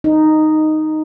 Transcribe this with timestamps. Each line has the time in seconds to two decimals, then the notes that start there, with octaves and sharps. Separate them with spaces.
0.04 D#4